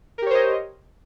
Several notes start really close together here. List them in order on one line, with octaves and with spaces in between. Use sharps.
A#4 G4 C#5 C5 D#5